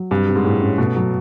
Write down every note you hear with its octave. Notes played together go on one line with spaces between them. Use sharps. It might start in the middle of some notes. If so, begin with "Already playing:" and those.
Already playing: F#3
G2 C3
C3
G#2
A2 G#3
C#4
B2 A3
F#3